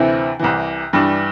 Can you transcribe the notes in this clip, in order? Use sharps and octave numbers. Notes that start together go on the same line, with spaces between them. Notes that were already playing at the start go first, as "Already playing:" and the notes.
Already playing: D2 C3 E3 C4 E4
C2 C3 E3
G2 E3 G3 D4